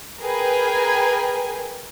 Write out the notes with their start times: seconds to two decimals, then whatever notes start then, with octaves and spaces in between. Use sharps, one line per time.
0.22 G#4 A#4 B4 G5 G#5